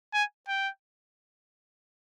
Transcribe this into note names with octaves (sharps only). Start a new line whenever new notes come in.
G#5
G5